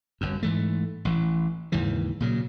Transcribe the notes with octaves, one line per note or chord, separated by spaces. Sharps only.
G1 F#2
G#2 E3 A3
A1 E3
D#2 G#2 C#3 E3
A#2 C#3 F#3